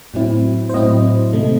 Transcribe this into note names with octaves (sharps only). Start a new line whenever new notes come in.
A2 F#3 C4 E4
C5
A2 F#3 C4 E4 D#5
C3 D#3 A3